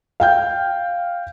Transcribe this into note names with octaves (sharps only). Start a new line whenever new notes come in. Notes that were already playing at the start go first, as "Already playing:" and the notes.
F5 G5 G6